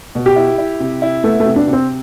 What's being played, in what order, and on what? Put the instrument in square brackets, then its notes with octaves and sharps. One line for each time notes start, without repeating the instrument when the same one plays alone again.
[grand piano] B2
[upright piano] G4
[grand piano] E4
E4
C3
E4
[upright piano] A3 [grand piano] B3
[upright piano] A3
[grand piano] C3
[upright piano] D4
[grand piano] C3
[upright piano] C4